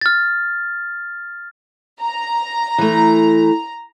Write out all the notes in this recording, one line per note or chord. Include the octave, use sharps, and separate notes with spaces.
F6 A6
A#5
E3 A3